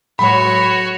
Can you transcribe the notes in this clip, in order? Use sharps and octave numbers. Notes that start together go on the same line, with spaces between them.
A2 F#3 G#3 F#4 C#5 B5